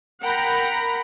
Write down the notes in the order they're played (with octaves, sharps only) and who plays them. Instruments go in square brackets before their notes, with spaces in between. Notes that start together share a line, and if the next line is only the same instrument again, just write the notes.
[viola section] A#4 F#5 G5 A#5 B5